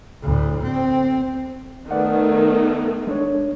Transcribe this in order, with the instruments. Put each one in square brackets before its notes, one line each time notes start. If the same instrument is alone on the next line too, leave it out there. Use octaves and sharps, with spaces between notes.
[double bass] D2 A2
C4
[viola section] D#3 A3 B3 [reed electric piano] B4 D5 F#5
[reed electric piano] G#3 D4 C#5